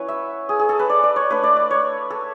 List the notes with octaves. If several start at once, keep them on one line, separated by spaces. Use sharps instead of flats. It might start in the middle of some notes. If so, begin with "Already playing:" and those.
Already playing: F#3 C#4 E4 B4 C#5
E5
G#4
G#4
A4
B4
D5
D5
C#5
A3 D4 B4
D5
D5
C#5
A4